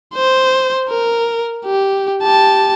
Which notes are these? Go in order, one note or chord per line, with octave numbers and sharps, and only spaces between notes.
C5
A#4
G4
G4 A5